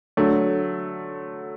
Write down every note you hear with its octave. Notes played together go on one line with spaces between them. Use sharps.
D3 F#3 A3